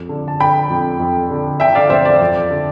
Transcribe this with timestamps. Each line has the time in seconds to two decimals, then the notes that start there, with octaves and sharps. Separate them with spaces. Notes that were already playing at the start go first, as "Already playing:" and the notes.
Already playing: F2
0.09 D3
0.28 A5
0.40 D3 G5 B5
0.70 F2
1.00 F2
1.31 D3
1.60 D3 E5 G5
1.75 D5 F5
1.90 F2 C5 E5
2.05 D5
2.21 F2
2.50 D3